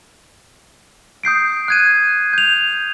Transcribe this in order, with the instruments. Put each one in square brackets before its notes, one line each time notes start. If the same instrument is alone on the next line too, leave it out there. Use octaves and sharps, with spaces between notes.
[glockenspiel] D#6 G6 C7 D7
F#6 G#6 D#7
G6 F7